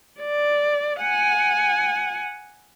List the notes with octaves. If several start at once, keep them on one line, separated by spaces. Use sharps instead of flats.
D5
F#5 G#5